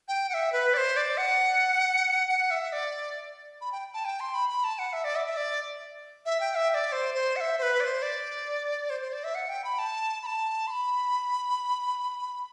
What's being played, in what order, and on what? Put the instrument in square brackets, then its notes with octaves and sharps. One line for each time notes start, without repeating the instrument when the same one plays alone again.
[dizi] G5
F#5
E5
B4
D5
C5
D5
F#5
F#5
E5
D5
B5
G5
A5
G5
C6
B5
B5
A5
F#5
E5
D5
E5
E5
D5
E5
G5
E5
E5
D5
C5
C5
F#5
E5
C5
B4
D5
C5
D5
C5
C5
D5
E5
F#5
G5
B5
A5
B5
A5
C6
B5